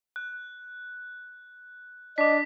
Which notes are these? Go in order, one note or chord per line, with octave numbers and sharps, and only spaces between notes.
F#6
D4 D#5 D6 B6